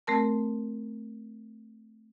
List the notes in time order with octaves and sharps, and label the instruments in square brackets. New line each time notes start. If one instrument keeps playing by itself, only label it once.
[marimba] A3 C4 A#4 A5